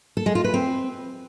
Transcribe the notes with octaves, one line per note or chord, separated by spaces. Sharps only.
A4
G#3
F4
B4
C4